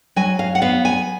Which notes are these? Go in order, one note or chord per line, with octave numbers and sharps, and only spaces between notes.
F#3 G#5
F5
F#5
B3 F5
G#5